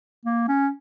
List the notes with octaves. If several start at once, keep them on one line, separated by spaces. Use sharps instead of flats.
A#3
C#4